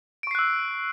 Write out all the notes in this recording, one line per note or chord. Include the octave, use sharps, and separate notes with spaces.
C#6 E6 F#6 C7 D7